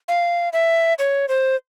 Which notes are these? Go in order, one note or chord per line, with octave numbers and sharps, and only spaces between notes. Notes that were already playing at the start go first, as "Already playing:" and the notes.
F5
E5
C#5
C5